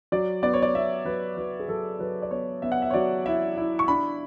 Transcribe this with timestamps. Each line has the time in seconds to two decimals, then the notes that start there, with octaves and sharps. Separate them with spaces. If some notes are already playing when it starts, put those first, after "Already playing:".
0.12 F#3 D5
0.43 B3 D5
0.53 C#5
0.62 D5
0.75 B3 E5
1.05 F#3 B4
1.37 F#3 B4
1.59 G#4
1.68 F#3 A4
1.99 F#3 B4
2.22 D5
2.31 B3 C#5
2.62 B3 E5
2.72 F#5
2.82 E5
2.90 C#5
2.94 F#3 D5
3.26 E4 E5
3.58 E4
3.79 C#6
3.88 D4 B5